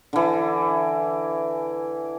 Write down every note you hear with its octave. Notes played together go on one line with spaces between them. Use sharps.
D3 E3